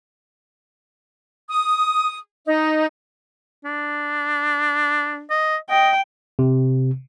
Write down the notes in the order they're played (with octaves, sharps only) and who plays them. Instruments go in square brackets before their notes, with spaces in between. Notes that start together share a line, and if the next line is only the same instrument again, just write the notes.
[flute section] D#6
D#4
[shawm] D4
D#5
[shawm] D#5 [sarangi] G5
[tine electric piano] C3